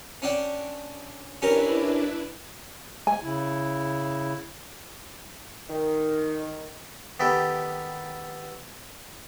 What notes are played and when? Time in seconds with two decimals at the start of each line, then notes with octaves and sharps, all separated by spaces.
0.22 C#4 D4 G5
1.42 C#4 D4 E4 G4 A#4 B4
3.07 G#5
3.23 C#3 E4
5.70 D#3
7.20 D#3 B3 G4 A4